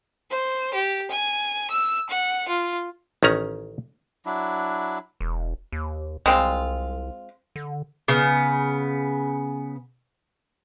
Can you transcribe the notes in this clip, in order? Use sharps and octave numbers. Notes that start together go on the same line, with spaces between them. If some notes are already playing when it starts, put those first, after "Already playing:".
C5
G4
G#5
E6
F#5
F4
A1 D#3 C#4 A#5
F#3 D4 E4
E1
D#2
C2 G#3 C4 F4
D3
C#3 B3